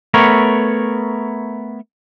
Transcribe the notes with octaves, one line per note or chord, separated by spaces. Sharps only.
A3 B3 A#4 C#5